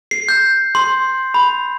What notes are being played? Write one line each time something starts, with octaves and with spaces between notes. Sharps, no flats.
C7
G6
C6
B5